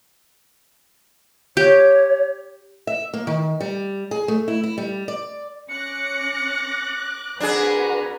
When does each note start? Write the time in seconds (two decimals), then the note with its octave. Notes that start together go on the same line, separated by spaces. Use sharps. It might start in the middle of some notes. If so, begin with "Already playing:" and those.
1.57 G4 C#5
2.87 E5
3.14 A#3
3.27 D#3
3.61 G3
4.11 G#4
4.28 A3
4.48 E4
4.64 E4
4.78 G3
5.08 D5
5.69 C#4 D6 F#6 A#6 C#7
7.40 C4 D4 F#4 G#4 A#4 B4 A#5